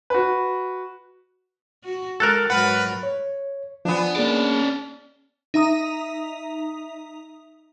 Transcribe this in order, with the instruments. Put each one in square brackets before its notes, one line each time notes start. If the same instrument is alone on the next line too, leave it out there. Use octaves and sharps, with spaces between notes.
[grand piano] F#4 B4
[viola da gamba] F#4
[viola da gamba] G#3 [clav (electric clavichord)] A4 A#4 [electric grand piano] F6 F#6 A6
[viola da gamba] G#2 F#3 A#4 [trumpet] B4 [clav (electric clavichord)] F#5
[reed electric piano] C#5
[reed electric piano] F3 G#5 [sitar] B3 D4
[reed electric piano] A#3 G#4 [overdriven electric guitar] C#4 D5
[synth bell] D#4 E5 A#5 D#6